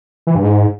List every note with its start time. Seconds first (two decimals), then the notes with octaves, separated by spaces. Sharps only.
0.27 E3
0.35 G2
0.43 G#2